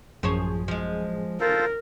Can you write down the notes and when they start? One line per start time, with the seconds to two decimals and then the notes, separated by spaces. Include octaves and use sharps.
0.23 A1 F#2 F3 G#4 C5 C#5
0.68 F3 G#3
1.41 F4 A4 A#4 C5